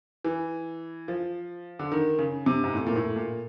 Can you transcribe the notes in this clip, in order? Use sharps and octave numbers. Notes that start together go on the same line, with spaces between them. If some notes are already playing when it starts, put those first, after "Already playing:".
E3
F3
D3
D#3
C#3
C3
G#2
A2
A#2
A2
A#2